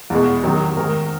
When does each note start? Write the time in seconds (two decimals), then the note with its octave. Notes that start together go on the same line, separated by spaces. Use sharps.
0.10 E2 B2 G#3
0.44 C3 D#3 F#3
0.77 G#2 D#3 G#3 A#4